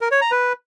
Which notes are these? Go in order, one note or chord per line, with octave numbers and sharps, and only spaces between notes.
A#4
C#5
A#5
B4